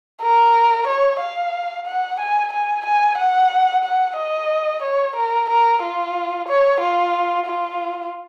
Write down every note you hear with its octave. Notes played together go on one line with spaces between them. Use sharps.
A#4
C#5
F5
F#5
G#5
G#5
G#5
F#5
F#5
D#5
C#5
A#4
A#4
F4
C#5
F4
F4